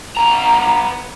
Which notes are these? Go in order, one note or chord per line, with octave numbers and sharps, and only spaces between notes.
B3 A#5